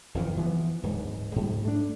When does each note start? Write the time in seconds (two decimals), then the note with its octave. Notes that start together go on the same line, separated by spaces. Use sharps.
0.14 F#1 F2 D#3 E3
0.37 E3 F3 A3 B3
0.83 D1 G#2
1.36 G#2 G3
1.65 A3 D4